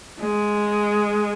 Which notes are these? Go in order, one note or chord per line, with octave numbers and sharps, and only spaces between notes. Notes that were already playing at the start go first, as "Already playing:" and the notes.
G#3